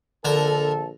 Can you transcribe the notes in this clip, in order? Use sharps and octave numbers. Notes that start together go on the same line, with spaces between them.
A#1 D3 A4 A#4